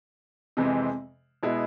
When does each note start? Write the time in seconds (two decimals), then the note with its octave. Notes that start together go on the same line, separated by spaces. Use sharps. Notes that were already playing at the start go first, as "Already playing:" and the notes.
0.57 F2 C3 E3 G#3 C4
1.43 B2 G#3 B3 E4 G#4